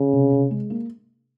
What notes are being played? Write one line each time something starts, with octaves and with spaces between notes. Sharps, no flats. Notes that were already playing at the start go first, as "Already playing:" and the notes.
Already playing: C#3
C3
C3
G#3
A#3